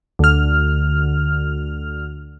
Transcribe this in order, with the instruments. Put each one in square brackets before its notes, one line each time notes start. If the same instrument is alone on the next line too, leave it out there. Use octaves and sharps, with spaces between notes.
[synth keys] D2 F6